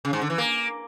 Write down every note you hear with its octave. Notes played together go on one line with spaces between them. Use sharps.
C#3
G#2
D3
E3
A#3